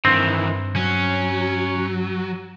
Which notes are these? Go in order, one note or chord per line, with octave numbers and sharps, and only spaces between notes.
G2 D#3 E3 C4
F#3 C#4